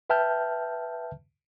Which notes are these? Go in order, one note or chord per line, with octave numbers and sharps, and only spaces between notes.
B4 E5 G5 A5 F6 G6